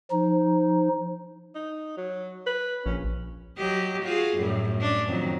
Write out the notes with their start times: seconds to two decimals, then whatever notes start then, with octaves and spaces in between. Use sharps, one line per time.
0.11 F3 D#4
1.55 D#4
1.97 F#3
2.46 B4
2.86 A#1 C#4
3.58 F#3 G4 D#5
4.03 F4 F#4 G#4
4.37 F#2 A2 G3
4.77 C#4 D4
5.07 F2 D#3 F#3